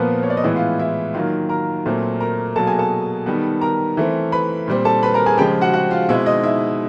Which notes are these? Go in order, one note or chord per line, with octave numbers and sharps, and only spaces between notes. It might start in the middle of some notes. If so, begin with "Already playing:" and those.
Already playing: A#2 F3 A#3 B3 A#4 B4
C#5
D5
D#5
A2 E3 G#3 B3 E4 E5
F4 F5
E4 E5
D#3 F#3 A#3 F4 F5
A#4 A#5
A#2 F#3 A3 C4
A#4 A#5
B2 F#3 A#3 A4 A5
G#4 G#5
A4 A5
D#3 G3 B3
A#4 A#5
E3 A3 C4
B4 B5
A#2 G3 C4
A4 A5
B4 B5
A#4 A#5
G#4 G#5
C#3 F3 G#3 G4 G5
F#4 F#5
F#4 F#5
F4 F5
B2 G#3 C4 E4 E5
D#4 D#5
E4 E5